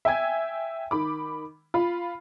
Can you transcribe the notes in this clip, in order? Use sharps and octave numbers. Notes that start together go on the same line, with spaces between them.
E5 G5 G#5 G#6
D#3 B5 D6
F4 B5